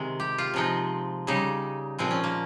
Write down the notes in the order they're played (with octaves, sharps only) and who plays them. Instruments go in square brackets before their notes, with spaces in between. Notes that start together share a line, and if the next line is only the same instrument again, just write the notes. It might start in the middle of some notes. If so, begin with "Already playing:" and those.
Already playing: [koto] C3 D#3 G#3
G4
F4
C3 F3 G#3 D#4
C#3 G3 D#4
A#2 F3 G#3 C4
C#4
A#3